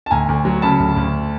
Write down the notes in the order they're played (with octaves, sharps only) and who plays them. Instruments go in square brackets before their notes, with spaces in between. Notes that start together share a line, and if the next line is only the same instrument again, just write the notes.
[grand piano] A5
D2 G#5 A#5
D2
F#3
C#3 A5 B5
D2
D2